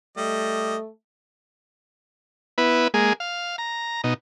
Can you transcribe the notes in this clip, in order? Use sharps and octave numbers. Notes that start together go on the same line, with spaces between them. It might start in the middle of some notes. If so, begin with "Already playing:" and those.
G3 A3 D#5
B3 E4 B4
G#3 A#3 G#4
F5
A#5
B2 D#4